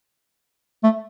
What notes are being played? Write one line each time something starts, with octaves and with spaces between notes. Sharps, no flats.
A3